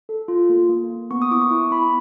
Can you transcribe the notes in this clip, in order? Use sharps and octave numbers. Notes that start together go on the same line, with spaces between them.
A4
F4
A#3
A#3
A#3
B3 C#6
D#6
E4 D6
C#6
E4
B3 B5